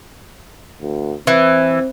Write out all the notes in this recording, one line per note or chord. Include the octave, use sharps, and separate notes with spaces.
D2
E3 C4